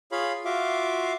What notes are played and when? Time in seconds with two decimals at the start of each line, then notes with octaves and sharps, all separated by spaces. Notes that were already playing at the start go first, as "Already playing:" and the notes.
0.12 F4 G#4 C#5 F5 B5
0.45 F4 F#4 E5 F5 D6